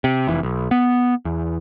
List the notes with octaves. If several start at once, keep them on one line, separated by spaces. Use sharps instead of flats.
C3
F1 E3
B1
B3
E2